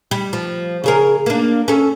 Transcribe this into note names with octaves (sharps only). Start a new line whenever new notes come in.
G3
F3
C#3 G#4 A#4
A#3 D4
C#4 A4